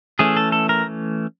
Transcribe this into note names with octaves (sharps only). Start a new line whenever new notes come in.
E3 A3 C#4 G#4
A4
A4
A#4